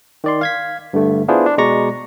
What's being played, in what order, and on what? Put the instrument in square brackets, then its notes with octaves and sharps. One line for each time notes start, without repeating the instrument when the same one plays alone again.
[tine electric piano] D#3 D5 C6
F5 G#6 B6
G2 D3 A3
B3 D4 E4 F4 G#4 C5
D4
B2 G#3 D5 A#5 C#6 A#6